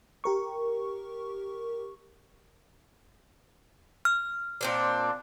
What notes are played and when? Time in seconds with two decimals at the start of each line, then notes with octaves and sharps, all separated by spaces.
0.24 G4 A#4 C#6
4.05 F6
4.61 A#2 C4 D4